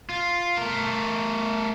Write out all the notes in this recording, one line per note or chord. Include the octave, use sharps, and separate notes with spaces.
F4
A3 A#4